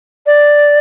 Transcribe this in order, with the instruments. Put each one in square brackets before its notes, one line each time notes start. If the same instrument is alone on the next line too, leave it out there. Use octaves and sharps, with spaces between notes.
[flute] D5